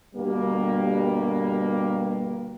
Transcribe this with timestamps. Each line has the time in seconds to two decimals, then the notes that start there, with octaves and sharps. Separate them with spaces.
0.15 G2 B2 D3 G3 A#3